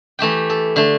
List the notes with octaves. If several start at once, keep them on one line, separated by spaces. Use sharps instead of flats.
E3 A3 G4 G5
A4
D3 A3